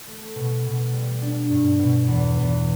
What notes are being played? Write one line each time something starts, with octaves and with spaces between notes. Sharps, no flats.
A3
B2
B2
G3
D4
G2
B2
E2
E2